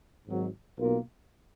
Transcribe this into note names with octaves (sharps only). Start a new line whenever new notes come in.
G#1 G#2 F#3
B1 B2 A#3 F4 A#4